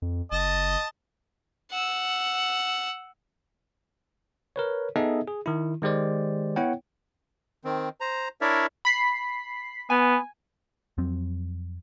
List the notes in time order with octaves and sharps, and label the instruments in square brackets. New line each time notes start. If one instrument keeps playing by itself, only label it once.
[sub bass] F2
[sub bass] F#1 [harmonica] D#5 A5
[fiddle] F#5 E6
[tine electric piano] A#4 B4 C#5
B3 D#4 G#4 A4 D#5 E5
G#4
D#3 E4
D#3 G#3 G4 C5 D5
B3 E4 C#5 F#5 G5
[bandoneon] D#3 C4
C5 A#5
D4 E4 A#4 C#5 D5 E5
[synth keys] B5 B6 C7
[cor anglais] B3 [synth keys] G#5
[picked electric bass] F2 F#3 C4